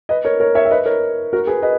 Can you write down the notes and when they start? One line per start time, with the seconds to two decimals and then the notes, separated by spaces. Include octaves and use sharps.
0.09 B4 D#5
0.24 A#4 C#5
0.40 A#4 C#5
0.55 C#5 E5
0.65 E5
0.70 B4 D#5
0.86 A#4 C#5
1.33 F#4 A#4
1.47 G#4 B4
1.62 B4 D#5